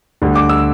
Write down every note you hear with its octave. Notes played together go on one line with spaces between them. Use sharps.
D2 D3 G3
D6
E6